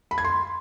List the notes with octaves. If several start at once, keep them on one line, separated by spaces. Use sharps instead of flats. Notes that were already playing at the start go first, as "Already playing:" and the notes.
B5
G#6
C6